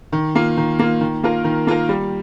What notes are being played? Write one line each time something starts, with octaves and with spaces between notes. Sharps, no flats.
D#3
A#3 F4
D#3
A#3 F4
D#3
A#3 F4 A#4
D#3
A#3 F4 A#4
G3